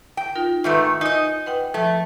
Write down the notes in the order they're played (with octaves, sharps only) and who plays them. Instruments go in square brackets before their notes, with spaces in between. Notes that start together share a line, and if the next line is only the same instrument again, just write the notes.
[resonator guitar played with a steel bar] G5
[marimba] D#4 F4 A#4
[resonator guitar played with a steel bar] G#2 D#3 A3 [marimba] B4 E5
[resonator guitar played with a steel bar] D#4 D#5 [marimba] G#5
[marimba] B4 F#5 G5
[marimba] F3 [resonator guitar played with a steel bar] A3